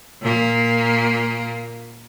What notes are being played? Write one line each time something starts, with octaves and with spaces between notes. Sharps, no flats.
A#2 A#3